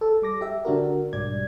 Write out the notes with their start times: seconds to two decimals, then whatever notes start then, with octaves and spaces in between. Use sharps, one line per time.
0.01 A4
0.22 G3 D6 A#6
0.41 G4 E5
0.65 D3 D4 F#4 A#4
1.13 B1 G#2 G3 D5 G#6